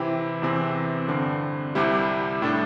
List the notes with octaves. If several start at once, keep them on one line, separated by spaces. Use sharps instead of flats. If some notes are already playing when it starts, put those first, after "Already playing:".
Already playing: C3 E3 C4 E4 G4
E2 C3 E3 C4
G2 D3 C4
C2 C3 G3 E4 G4
A2 G3 D4 A4